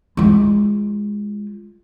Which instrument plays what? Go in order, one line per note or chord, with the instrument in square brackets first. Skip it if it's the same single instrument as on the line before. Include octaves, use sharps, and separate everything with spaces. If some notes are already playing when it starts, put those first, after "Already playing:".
[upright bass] G#3 F4